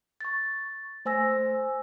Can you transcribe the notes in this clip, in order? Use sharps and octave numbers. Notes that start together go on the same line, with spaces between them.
C#6 A6
A3 C5 G#5 E6 A#6